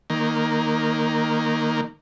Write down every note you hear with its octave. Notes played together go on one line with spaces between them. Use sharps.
D#3 A#3